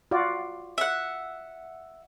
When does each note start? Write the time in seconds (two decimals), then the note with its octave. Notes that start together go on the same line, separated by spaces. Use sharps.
0.11 F4 F#4 D5
0.78 E5 F#5